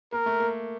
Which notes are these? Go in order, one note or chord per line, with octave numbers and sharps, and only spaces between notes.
A#3 A#4
A3
A#3